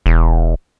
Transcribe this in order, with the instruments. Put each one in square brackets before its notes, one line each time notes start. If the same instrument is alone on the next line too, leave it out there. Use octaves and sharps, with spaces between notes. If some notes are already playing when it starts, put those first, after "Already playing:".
[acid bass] E1